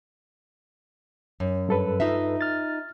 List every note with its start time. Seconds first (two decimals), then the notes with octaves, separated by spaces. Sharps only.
1.40 F#2
1.69 G2 A4 B4
2.00 D#4 F4 E5
2.41 F6 A6